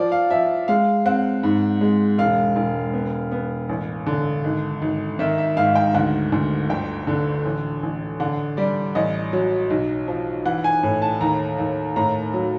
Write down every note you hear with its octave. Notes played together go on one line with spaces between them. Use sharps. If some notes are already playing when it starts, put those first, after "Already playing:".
Already playing: F3 D5
F5
F3 E5
G#3 F5
C4 F#5
G#2
G#3
E1 F5
E1
B3
B3
A1
D3
G#1
G#1
D#3 E5
E5
G#2 F5
G5
D2 F#5
D2
G1 G5
D3
A1
A1
D3 F#5
G3 D5
A1 D#5
F#3
B1
F3
E3 F#5
G#5
A2
A5
D#2 A#5
D#2
A2 A#5
F#3